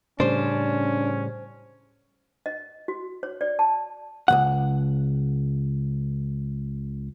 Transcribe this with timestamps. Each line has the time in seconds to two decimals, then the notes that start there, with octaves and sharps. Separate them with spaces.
0.20 A2 C#3 G3 C#4 D4 C5
2.46 D#5
2.88 F#4
3.23 C#5
3.41 D5
3.59 A5
4.28 C#2 C3 F#5